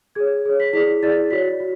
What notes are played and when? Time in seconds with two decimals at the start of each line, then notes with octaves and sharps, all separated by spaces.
0.15 G#4 C#5 G#6
0.45 G#4 C#5
0.60 B6
0.73 E4 G#4 D5 B6
1.03 E4 G#4 D5 A6
1.31 F#4 C#5 B6
1.60 F#4